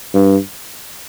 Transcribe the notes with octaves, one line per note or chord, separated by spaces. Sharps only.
G2